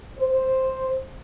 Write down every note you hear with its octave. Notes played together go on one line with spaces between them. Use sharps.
C5